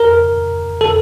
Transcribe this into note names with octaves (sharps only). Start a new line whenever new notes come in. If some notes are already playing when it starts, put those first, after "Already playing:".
Already playing: A#4
A4